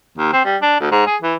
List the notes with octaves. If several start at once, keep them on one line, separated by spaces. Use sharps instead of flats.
D#2
C4
G3
D4
D2
G#2
G#4
E3